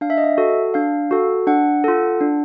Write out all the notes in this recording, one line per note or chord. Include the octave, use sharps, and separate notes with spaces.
D4 F5
E5
D#5
E5
F#4 A4
D4 F5
F#4 A4
D4 F#5
F4 A4
D4